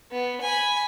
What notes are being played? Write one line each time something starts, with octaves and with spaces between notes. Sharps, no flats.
B3
G#5 B5